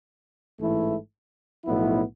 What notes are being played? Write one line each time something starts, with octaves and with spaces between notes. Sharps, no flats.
A1 G#2 E3 A3 E4
B1 A2 F3 B3 E4